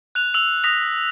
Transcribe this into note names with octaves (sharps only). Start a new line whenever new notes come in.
F#6 F7
E6 F7
D#6 A#6 B6 F7